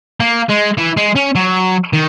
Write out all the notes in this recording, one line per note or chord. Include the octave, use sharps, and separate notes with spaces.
A#3
G#3
E3
G#3
C#4
F#3
D#3